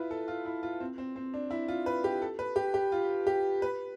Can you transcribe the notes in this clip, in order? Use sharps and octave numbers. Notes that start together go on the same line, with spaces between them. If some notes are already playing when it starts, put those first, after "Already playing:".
Already playing: E4 F4 B4
A4
F4
E4
F4
C4
C4
C4
D4
E4
F4
B4
G4
A4
B4
G4
G4
F4
G4
B4